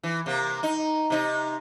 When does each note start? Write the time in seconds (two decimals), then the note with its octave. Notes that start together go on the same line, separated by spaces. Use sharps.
0.03 E3
0.26 C3 A#3
0.63 D#4
1.10 C3 D#4